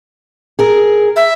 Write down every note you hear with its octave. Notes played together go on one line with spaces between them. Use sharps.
G#4 A#4
E5